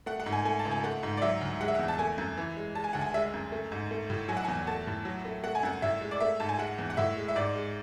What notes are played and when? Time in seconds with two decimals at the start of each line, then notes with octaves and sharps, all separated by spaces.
0.06 A3 F#5
0.20 F#5
0.26 G#2
0.32 G#5
0.45 A3 G#5
0.59 A5
0.65 C#2
0.71 G#5
0.84 A3 F#5
1.03 G#2
1.17 D5
1.22 F#3 E5
1.41 D2
1.61 G#3 F#5
1.68 E5
1.75 F#5
1.79 E2
1.88 A5
1.99 A3 G#5
2.18 F#2
2.37 E3
2.57 G#3
2.75 G#3 A5
2.84 G#5
2.93 D2 F#5
3.01 G#5
3.14 G#3 E5
3.34 F#2
3.52 A3
3.72 G#2
3.91 A3
4.10 A2
4.28 F#3 G#5
4.37 F#5
4.45 G#5
4.48 E2
4.67 A3 A5
4.87 A2
5.05 F#3
5.25 A3
5.44 A3 F#5
5.55 G#5
5.63 F#2 F#5
5.82 A2 E5
6.01 G#3
6.11 D5
6.20 A3 E5
6.40 G#2 A5
6.49 G#5
6.58 G#3 F#5
6.78 E2
6.90 F#5
6.97 A2 E5
7.17 G#3
7.28 E5
7.36 G#2 D5
7.55 G#3